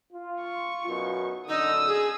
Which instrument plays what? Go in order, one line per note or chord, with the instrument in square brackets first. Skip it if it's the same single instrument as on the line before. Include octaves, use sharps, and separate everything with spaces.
[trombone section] F4
[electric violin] C#6
[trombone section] B1 F#2 B2
[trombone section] F#2 D3 [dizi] D#4 [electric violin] D#6 E6
[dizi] G#4